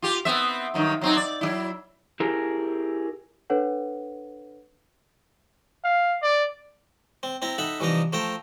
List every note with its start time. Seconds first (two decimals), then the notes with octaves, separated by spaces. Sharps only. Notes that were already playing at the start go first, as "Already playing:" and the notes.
0.02 F4 G4
0.25 B3 C4 E5
0.74 G2 D#3 F#3
1.02 F#3 C4 D#4
1.17 D5
1.41 F#3 G3 E4
2.20 E4 G4 G#4 A#4
3.50 D4 A4 B4 C#5 F#5
5.84 F5
6.22 D5
7.23 C4
7.42 C4 E4 A#5
7.58 D#4 A4 E5 F#5 B5
7.80 C2 E3 F3 D#4 A#5
8.13 F3 A3 A4 G5 A#5